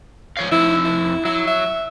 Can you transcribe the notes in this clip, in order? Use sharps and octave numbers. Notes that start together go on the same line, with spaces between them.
F3 C#5 F5
F2 F3 E4 E5
E4
F#3 E4
E5